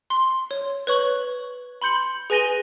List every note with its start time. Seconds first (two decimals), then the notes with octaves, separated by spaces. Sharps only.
0.10 C6
0.51 C#5
0.87 B4 C#5 C#6 F#7
1.82 B5 C6 G6 C#7 F#7
2.30 G#4 B4 G#5 A#6 D#7 G7